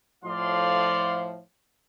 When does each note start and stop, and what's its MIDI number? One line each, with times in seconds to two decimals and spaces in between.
0.24 1.38 45
0.24 1.38 53
0.24 1.27 74
0.24 1.27 77
0.24 1.27 84